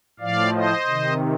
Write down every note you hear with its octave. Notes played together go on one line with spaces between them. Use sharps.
A2 F3 D5 F5
C5 D#5
C3 D#3